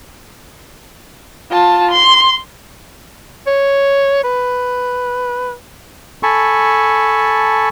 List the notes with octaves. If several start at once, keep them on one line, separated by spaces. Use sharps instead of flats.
F4 A5
C6
C#5
B4
A4 G#5 A5 B5 C#6